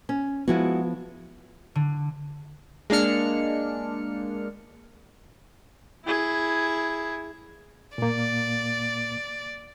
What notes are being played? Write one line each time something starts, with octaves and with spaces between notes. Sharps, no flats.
C#4
F3 G#3 B3 E4 F#4
D3
G#3 A#3 D4 F6 C#7
E4 G#4
A#2 A#3 D5